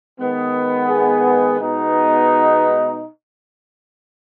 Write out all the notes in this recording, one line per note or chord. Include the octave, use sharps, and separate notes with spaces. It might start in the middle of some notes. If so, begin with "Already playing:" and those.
D#3 G#3 B3
G#4
B2 G#3 B3 D#4